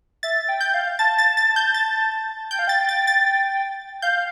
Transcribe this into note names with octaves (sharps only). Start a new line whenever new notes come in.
E5 A6
G5
G6
F5
A5 A6
A6
A6
G6
A6
G5 G6
F5
G5 A6
A6
A6
F5 G6